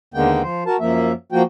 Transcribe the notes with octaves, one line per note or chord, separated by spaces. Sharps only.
D#2 D3 G#3 A#3 B3 G5
F3 C5
F#4 A#4 A5
F#2 F3 A#3 E5
F3 A#3 F#4 G5